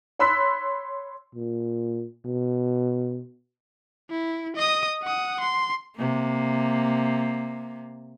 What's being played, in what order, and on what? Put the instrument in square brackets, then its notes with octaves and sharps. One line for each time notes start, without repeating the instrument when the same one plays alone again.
[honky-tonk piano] C#5 B5 C6 E6 F#6 B6
[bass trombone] A#2
B2
[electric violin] E4
D#5 D#6
F#5 D#6
C6
[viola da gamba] C3 A#3